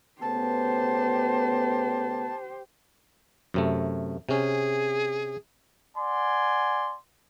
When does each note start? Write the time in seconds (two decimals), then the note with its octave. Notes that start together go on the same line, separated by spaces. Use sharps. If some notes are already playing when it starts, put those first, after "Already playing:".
0.21 C#3 A3 B3 G4 C5 A5
3.54 F#2 C3 A3
4.29 C3 C#4 G#4
5.96 D5 F#5 G#5 C6